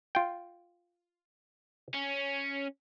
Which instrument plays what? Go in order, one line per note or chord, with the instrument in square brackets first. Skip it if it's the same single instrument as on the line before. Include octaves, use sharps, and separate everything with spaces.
[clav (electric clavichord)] F4 G5
[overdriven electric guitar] C#4